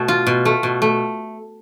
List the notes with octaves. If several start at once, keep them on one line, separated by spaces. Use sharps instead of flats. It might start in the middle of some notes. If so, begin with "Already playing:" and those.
Already playing: B2 A3
F4
B2
A3
B2
A3